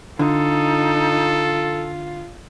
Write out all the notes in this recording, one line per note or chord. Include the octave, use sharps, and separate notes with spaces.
D3 D#4 F4 A4